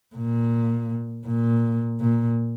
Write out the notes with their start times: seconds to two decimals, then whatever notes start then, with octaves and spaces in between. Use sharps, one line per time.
0.15 A#2
1.26 A#2
2.00 A#2